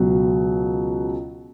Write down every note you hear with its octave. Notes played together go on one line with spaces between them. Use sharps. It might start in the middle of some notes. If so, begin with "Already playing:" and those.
Already playing: C#2 B2 F#3